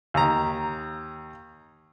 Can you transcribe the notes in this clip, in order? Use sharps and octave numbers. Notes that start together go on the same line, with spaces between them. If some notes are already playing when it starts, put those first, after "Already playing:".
D#2 A#5